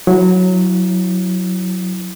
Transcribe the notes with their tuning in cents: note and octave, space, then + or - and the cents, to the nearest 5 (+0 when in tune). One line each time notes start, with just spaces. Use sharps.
F#3 -10 E4 +0